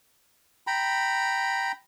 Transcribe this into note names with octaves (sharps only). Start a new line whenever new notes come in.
G5 A#5 B5